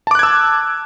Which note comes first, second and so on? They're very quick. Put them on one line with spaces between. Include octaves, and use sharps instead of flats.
A5 D6 F#6 G#6 E6